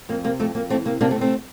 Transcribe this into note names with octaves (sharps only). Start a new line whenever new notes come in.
F2 A#3
C3 A#3
F2 A3
F2 A#3
E3 A3 C4
C3 A#3
C3 A#3 D4
A3 C4
C3
A3 C4